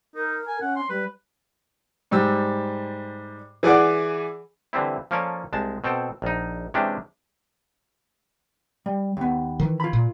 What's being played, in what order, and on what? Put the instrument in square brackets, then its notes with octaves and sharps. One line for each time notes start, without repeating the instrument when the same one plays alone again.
[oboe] D#4 [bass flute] A#4
[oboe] G#5
[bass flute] C#4 [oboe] F#5
[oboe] C6
[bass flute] G3 [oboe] B4
[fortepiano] G#2 G3 E6
E3 G#4 D5 F#5 D6
[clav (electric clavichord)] D3 E3 G3 C4 E4
F3 A#3 C#4 A4 C#5 D5
C2 G#3 A5
B2 C4 A4 G5
A#1 D#4
C3 E3 G#3 C#4 D4 G4
[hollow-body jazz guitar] G3
D#2 B3
[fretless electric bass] D#3 E3
[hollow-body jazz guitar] F4 B5
[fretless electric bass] A#2